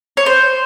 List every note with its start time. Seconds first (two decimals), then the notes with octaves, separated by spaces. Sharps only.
0.17 C#5
0.26 C5